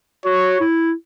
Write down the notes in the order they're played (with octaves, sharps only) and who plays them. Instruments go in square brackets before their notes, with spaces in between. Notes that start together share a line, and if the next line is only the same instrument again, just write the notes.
[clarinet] F#4 [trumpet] C#5
[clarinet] E4